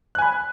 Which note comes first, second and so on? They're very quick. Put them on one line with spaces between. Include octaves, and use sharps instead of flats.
F#6 G#5 B5